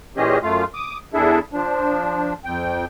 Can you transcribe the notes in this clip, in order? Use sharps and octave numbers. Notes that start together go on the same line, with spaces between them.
A#2 E3 C#4 G4 G#4 D#5
F#2 A3 F4 F5
D6 D#6
E2 D4 E4 G#4 A4 E5
F3 D4
F2 G5